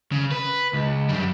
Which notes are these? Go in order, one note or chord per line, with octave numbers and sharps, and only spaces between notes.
C#3
B4
C#2
F#2 G3